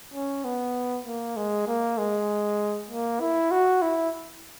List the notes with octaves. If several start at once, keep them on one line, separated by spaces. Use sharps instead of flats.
C#4
B3
A#3
G#3
A#3
G#3
A#3
E4
F#4
E4